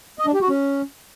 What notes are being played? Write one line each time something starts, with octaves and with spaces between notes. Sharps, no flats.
D#5
D4
G4
F#4
C#4